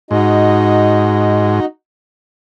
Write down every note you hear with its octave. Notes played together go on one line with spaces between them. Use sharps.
G#2 D#4 F#4 D#5